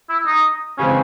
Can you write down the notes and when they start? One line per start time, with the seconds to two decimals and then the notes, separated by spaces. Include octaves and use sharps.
0.09 E4
0.26 D#4
0.78 C#3 E3 G#3 C4 C#4